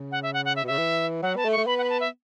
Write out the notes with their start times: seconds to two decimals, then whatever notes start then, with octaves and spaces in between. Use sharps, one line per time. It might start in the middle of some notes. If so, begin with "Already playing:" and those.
Already playing: C#3
0.12 F#5
0.23 E5
0.34 F#5
0.45 F#5
0.56 E5
0.64 B2
0.67 C#3 E5
0.78 E3
1.22 F#3 F#5
1.36 B3 A5
1.45 A3
1.52 C#6
1.58 A3
1.67 B3 B5
1.78 F#5
1.84 B5
1.90 A5
2.00 E5